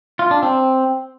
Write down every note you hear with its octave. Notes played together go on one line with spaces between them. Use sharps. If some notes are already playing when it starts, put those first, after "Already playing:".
F4
D4
C4